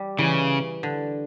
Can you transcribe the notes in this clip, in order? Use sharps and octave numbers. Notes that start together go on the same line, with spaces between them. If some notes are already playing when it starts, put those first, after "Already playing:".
Already playing: G3
C#3 E3
D3